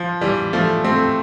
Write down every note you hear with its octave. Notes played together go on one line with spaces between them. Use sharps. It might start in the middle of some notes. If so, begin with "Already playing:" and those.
Already playing: F3
E3 G3
F3 A3
A3 C4